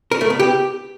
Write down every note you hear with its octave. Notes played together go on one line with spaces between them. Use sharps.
A#4
A3
B3
G4